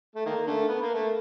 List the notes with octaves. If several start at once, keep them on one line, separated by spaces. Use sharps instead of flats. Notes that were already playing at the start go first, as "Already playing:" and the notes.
A3
D#3 A#3
D3 A3
B3
A#3
A3